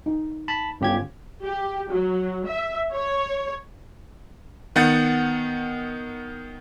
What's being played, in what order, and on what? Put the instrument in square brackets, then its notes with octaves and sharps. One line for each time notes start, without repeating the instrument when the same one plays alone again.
[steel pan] D#4
[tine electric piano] A5 B5
[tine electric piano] G1 G4 G#6 [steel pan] C#4 F4
[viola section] G4
F#3
E5
C#5
[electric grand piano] D#3 B3 F#5 G6 A6 C#7